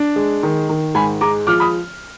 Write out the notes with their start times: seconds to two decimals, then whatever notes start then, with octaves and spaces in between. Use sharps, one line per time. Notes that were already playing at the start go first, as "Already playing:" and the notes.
Already playing: D4
0.16 G#3
0.43 D#3
0.69 D#3
0.95 G#2 G#5 B5
1.21 G#3 A#5 D6
1.47 F3 D6 F6
1.60 B5 D#6